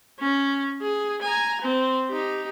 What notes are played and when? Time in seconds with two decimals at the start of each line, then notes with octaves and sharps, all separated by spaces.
0.19 C#4
0.81 G#4
1.22 G#5 A#5
1.61 C4
2.09 D#4 G4